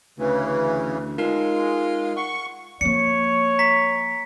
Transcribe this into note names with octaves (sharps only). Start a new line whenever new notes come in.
D2 C#3 E3
G#3 D#4 F4 A#4
F#5 C#6
F3 A#3 C#5 C#7
A#5 B6